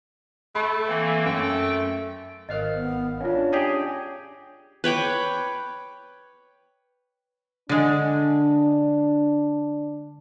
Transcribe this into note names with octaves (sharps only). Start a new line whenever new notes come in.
A3 B5
E3 A#3 C4
F#2 A3 G5
G#1 A#4 C5 D#5 F5 F6
B3
C#4 D4 F4 C#5 F5
G4 G#4 D5 D#5 G5
B4 C#5 G5 D6
D3 G#3 D4